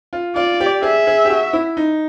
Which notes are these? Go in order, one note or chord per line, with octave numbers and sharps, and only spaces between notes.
F4
F4 D5
G4
G#4 E5
G#4
G4
F#4
E4
D#4